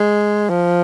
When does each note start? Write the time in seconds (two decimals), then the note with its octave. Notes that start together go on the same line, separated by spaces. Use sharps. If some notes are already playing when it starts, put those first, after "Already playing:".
Already playing: G#3
0.49 F3